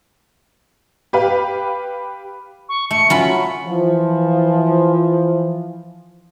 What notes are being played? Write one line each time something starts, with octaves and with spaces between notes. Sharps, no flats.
G4 B4 F5
C#6
A3 C#7
F#3 C#4 F4 B5
E3 F3